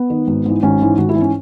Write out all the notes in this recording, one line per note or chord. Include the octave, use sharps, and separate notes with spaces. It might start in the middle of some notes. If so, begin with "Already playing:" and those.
Already playing: B3
D#3
G#1
G#2 E3
G#1 C#4
G#2 E3
G#1 F#4
E4
G#2 E3
C#4